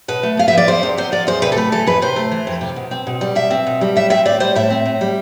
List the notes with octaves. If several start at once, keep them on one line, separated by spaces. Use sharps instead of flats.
B2 B4
A3
B3 F5
E5
F3
D5
E2 C5
C3
B3 C5
F3 D5
E2 C5
C3 B4
A4
A3 B4
E3 A4
F2 B4
C3 C5
A3
E3
F2
C3
B2
C4
B2
G3
B2 E5
C4
B2
G3
A2 E5
C4 E5
A2 D5
G3 C5
A2 E5
C4
A2
G3